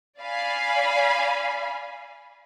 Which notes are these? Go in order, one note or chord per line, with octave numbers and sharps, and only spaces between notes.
D5 F5 G#5 B5